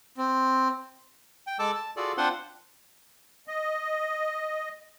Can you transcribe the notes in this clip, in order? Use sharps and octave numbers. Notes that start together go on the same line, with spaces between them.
C4
G5
G#3 A4 A5 D6 E6
A5
F4 F#4 G#4 A4 D5
C4 D4 F4 C5 F#5 C6
D#5